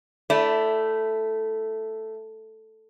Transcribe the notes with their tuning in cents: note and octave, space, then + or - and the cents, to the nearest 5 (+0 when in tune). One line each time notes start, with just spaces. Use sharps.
A3 +0 E4 +0 D5 -25